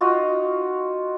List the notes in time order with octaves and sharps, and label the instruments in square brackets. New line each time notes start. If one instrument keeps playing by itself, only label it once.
[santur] D#4 F4 F#4 D#5